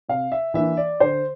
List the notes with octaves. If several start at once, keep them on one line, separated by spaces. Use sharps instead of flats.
C3 F5
E5
E3 A#3 D4 E5
D5
D3 C5